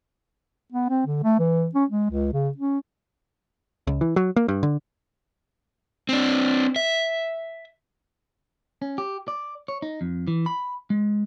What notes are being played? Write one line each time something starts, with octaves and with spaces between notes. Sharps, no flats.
B3
C4
D3
A3
E3
C#4
G#3
C#2
C#3
C#4
C#2
E3
F#3
A#3
G2
D3
C4 D4
E5
C#4
G4
D5
C#5
D#4
F2
E3
B5
G#3